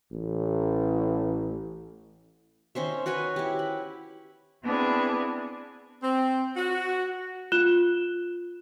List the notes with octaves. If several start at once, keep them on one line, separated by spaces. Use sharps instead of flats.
A1
D#3 C#4 C5 E5
F#4 B4 C#5 G#5
E4 G4
B5
B3 C4 D4 E4 G#4
C4
F#4
F4 F#6 E7 G7